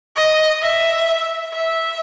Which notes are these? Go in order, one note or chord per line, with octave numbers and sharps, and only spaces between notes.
D#5
E5
E5